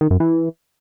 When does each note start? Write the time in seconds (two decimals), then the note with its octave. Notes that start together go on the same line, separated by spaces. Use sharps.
0.01 D#3
0.11 F#2
0.20 E3